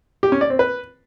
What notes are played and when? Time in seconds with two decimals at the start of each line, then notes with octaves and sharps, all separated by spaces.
0.23 G4
0.32 C#4
0.41 D5
0.50 C4
0.59 B4